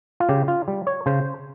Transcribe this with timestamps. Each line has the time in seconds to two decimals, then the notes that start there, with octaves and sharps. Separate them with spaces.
0.20 F4
0.29 C#3 G4
0.48 F4
0.68 G3
0.87 C#5
1.06 C#3 C5